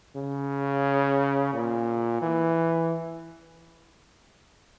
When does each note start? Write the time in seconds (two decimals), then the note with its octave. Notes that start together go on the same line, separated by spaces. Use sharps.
0.16 C#3
1.53 A#2
2.22 E3